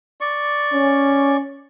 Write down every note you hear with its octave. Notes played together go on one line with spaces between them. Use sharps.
D5 C#6
C#4